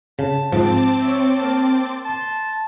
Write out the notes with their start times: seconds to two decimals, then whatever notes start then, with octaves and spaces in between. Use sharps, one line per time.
0.19 C#3 A5
0.52 G#2 F3 C4 D6 A6
1.01 C#5 E5
1.34 A#3 A5
2.05 A5 C6